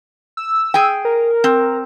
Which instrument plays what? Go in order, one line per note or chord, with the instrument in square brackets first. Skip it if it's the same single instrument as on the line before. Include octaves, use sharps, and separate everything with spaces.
[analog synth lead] E6
[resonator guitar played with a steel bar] G#4 G5
[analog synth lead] A#4
[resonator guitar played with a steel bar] C4